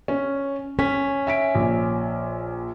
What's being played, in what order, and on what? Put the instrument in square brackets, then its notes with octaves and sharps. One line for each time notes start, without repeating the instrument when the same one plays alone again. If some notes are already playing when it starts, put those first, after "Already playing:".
[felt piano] C#4
[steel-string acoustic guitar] C#4 [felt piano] B6
[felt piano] E5 B6 D7
A#1